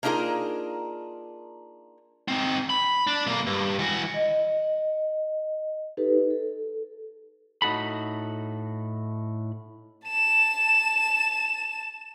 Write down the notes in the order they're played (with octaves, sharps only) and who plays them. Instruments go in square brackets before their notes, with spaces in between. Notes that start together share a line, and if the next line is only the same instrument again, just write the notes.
[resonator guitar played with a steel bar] A#3 D4 D#4 F4 G#4 A#4
[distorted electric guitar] C4 D#4
B5
D4
B1 A#3
G2
E3 F#4
[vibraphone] D#5
D#4 G4 A4 B4
A4
[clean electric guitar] A2 D#4 F#4 A4 B5
[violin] A5 E7